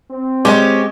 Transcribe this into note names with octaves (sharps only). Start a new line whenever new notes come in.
C4
G#3 C#4 G4